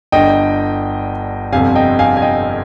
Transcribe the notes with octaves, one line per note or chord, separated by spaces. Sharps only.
G1 G2 D3 D#5 G5
G1 F2 C3 F5 G#5
D#5 G5
F5 G#5
G#5
D#5 G5